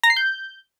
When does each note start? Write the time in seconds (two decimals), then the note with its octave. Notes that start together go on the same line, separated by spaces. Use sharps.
0.03 A#5
0.10 C7
0.16 G6